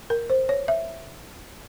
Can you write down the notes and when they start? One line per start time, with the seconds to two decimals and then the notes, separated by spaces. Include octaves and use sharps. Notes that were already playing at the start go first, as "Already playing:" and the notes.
0.10 A#4
0.30 C5
0.49 C#5
0.68 E5